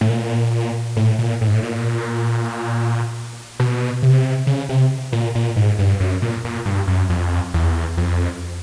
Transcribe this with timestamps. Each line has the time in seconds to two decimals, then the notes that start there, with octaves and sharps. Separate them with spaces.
0.01 A2
0.10 A#2
0.97 A2
1.19 A#2
1.41 A2
1.47 G#2
1.54 A2
1.63 A#2
3.60 B2
4.03 C3
4.47 C#3
4.69 C3
5.12 A#2
5.35 A#2
5.56 G#2
5.79 G2
6.00 F#2
6.22 A#2
6.44 A#2
6.65 G2
6.87 F#2
7.10 F2
7.54 E2
7.97 F2